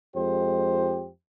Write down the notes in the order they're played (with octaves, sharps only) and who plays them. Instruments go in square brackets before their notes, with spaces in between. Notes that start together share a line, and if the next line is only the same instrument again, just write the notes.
[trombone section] F2 G#3 G4 C5